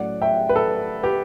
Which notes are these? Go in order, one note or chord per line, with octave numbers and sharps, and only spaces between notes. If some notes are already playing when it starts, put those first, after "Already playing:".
Already playing: A2 F#3 A3 C#4 D5 F#5
E5 G5
B4
A4
G4 B4